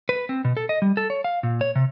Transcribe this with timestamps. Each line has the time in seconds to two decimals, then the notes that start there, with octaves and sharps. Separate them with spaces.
0.09 B4
0.29 C4
0.45 B2
0.57 A4
0.69 D#5
0.82 G3
0.97 A4
1.10 C#5
1.24 F5
1.43 A#2
1.61 C#5
1.75 C3